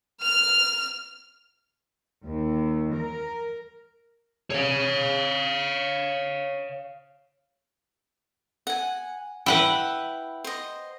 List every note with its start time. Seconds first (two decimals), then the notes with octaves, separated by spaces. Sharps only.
0.21 F6 F7
2.23 D#2
2.94 A#4
4.51 C#5 F5
8.67 F#5 G#5
9.46 E4 B4 F#5 G5
10.44 C5 D#5